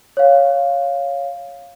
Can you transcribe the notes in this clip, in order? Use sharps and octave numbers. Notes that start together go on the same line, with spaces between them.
C#5 F5